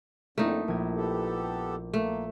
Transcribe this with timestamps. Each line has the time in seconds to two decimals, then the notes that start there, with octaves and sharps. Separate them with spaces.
0.38 F2 D3 A3 A#3 D#4 E4
0.68 A#1 D#3 G#6
0.96 B3 G4 A4
1.94 A3 A#3